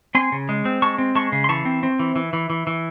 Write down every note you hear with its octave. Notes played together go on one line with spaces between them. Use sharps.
C4 G#5 C6
C#3
G#3
C4
G#3 A5 C#6
C4
G#3 A5 C#6
C#3
C6
E3 A5 C#6
C4
C4
E3
E3
E3
E3
E3